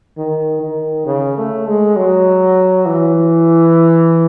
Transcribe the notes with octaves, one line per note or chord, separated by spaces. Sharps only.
D#3
D#3
C#3
A3
G#3
F#3
E3